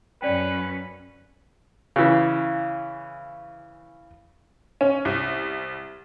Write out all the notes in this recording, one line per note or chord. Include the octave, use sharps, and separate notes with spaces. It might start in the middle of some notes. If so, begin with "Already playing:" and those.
F#2 C#4 B4 D5 G5
C#3 E3
C#4
C2